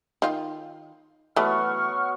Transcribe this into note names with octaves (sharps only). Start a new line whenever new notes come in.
D#3 F4
E3 F#3 A3 B3 F#4 F#5 C#6 F6